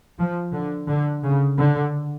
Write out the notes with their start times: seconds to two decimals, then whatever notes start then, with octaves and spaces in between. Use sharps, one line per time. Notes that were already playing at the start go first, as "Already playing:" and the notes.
0.19 F3
0.53 D3
0.88 D3
1.23 C#3
1.58 D3